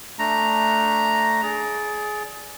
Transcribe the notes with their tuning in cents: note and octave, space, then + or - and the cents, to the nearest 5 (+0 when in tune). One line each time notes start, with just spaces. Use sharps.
A3 +0 D4 +0 A#5 +0
G#4 +20 D5 -15